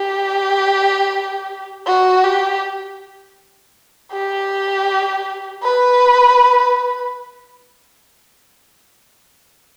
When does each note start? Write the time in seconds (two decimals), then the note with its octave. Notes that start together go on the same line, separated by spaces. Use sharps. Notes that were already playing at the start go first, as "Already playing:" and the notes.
Already playing: G4
1.87 F#4
2.24 G4
4.13 G4
5.62 B4